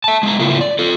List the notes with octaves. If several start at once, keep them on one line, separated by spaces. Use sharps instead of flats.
E5 A5
G#3 E5 A#5
C#3 A3 A#3 E4 F4 B4
D5
F4 A4